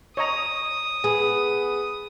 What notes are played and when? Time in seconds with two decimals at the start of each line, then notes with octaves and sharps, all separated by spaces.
0.17 C#5 D#5 A#5 D#6
1.04 B3 G#4